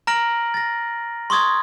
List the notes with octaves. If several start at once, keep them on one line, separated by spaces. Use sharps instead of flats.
A#5 F6 A#6 D7 F#7
A6 A#6
C6 C#6 D#6 G#6 A6